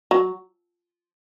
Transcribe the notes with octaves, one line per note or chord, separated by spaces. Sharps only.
F#3